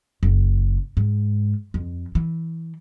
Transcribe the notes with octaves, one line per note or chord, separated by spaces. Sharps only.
F#1
G#2
F2
E3